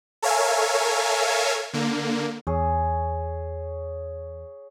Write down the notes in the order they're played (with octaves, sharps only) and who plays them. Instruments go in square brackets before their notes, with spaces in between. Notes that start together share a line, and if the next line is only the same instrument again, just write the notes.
[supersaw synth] A4 A#4 C#5 E5 F5 G#5
D3 A#3
[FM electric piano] E2 [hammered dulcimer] G#4 C#5